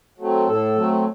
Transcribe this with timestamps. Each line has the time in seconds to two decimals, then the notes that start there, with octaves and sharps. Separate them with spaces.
0.18 F#3 A3 C4
0.47 A2 A4
0.76 F#3 A3 C4